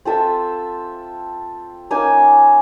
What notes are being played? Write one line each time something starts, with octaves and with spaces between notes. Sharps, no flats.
C4 F4 A4 E5
A#3 C#4 D#4 G#5